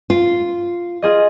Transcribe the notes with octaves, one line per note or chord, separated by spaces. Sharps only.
F4
F4 G#4 D#5